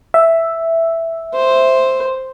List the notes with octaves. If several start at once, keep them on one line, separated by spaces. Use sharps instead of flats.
E5
C5